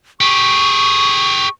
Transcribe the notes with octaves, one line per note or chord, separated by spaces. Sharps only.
G4 G#4 C#6